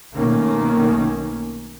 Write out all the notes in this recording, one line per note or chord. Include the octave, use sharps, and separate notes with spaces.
B1 B2 D#3 A3 A#3 C#4